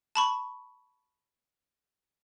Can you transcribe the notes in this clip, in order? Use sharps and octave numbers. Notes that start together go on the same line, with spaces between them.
A5 B5 C#6